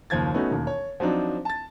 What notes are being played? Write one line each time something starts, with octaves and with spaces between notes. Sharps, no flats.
F#1 D#2 F3 G#6 A6
A3 B3 C#4 D#4 F#4
E1 D#2
C#5
F3 F#3 C4 D4 D#4
A5 A6